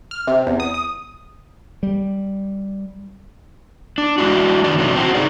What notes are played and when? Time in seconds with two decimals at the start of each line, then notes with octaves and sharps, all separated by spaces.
0.11 F6
0.27 C3
0.47 E2
0.60 D#6
0.74 D#6
1.83 G3
3.98 D4
4.18 G#3 D4 E4 F#4
4.64 D#3 D4 E4 F#4 B4 D5
4.78 C3 E3 F#3 A3 D4
4.95 C4 F#4
5.14 D#4 G#4 D5